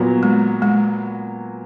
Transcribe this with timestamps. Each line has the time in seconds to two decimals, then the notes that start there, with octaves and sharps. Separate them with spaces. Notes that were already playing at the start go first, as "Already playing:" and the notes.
Already playing: A#2 F#3 B3
0.23 G#3
0.62 G#3